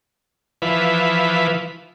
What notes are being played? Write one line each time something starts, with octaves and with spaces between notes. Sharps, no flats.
E3 F3 B4